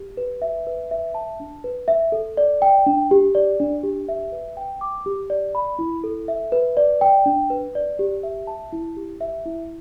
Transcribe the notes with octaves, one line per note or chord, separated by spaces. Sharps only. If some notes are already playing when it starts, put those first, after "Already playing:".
Already playing: G4
B4
E5
B4
E5
A5
D4
B4
E5
A4
D5
G5
D4
G4
D5
D4
G4
E5
B4
G5
D6
G4
D5
B5
E4
A4
E5
B4
D5
G5
D4
B4
D5
G4
E5
A5
E4
G4
E5
E4